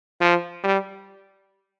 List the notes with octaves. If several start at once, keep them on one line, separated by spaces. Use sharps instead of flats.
F3
G3